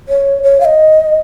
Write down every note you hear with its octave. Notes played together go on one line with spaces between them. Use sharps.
C#5
C#5
F5
D#5